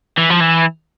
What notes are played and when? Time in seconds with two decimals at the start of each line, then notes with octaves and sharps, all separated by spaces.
0.18 E3
0.30 F3
0.40 E3